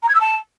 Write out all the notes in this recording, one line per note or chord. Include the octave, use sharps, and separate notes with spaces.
A#5
G#6
E6
A5